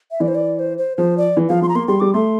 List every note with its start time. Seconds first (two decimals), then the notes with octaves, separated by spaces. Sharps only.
0.11 E5
0.20 E3 D5
0.28 C5
0.35 D5
0.59 C5
0.78 C5
0.98 F3 C5
1.17 D5
1.37 E3
1.49 F3 F5
1.62 F3 C6
1.69 A#5
1.75 A#3 C6
1.88 G3 C6
2.00 G3 D6
2.13 A3 C6